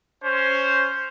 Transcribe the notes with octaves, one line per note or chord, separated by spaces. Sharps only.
C#4 C5